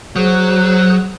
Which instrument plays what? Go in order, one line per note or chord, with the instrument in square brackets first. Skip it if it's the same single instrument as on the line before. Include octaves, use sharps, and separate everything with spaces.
[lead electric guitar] F#3 [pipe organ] G#4 C5 F#6